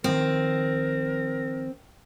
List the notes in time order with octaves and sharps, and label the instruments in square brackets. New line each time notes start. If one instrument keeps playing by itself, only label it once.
[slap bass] D#3 F3 [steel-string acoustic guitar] C4 [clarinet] A#4